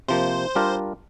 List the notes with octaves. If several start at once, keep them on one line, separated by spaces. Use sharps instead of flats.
C3 F3 A#3 C5
G3 D4 F4 A#4